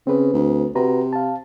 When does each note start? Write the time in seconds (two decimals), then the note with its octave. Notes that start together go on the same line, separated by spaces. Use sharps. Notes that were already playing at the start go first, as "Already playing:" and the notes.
0.07 C#3 C4 B4
0.33 D2
0.75 C3 F#4 B4 A#5
1.13 F5 A5